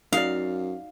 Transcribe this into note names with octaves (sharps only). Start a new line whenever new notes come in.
F#2 D#4 F#4 D5 F5